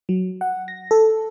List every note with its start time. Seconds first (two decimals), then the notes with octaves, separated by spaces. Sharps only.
0.09 F#3
0.41 F#5
0.68 A#6
0.91 A4